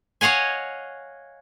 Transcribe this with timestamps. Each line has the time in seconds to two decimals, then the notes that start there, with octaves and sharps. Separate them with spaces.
0.21 C#5 D#5 F5 F#5 G#5